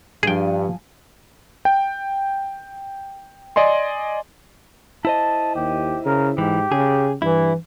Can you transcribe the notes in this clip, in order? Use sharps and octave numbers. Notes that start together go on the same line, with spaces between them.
G2 F3 G#4 G5 G#5
G5
D5 D#5 G#5 C6
E4 C5 D#5 A5
D#2 G4
C#3 A#4
G#2 E3 G4
C#3 G#4
G2 E3 E4